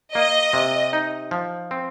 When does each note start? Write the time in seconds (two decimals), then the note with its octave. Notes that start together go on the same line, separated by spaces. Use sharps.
0.15 A#3 D#5
0.53 C3
0.93 D#4
1.31 F3
1.71 C4